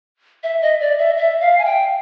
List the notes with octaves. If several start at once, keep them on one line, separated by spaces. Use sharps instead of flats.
E5
D#5
D5
E5
E5
F5
G#5
G5